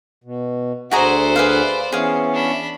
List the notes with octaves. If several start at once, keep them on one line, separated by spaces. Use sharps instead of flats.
B2
D2 F#4 G#4 C5 D5 E5 F#5 A#5
G#4 B4 F5
E3 B3 C#4 G#4 F5
D4 B5